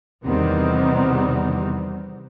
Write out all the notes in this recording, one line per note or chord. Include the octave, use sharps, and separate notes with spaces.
E2 C3 D#3 G3 B3 C4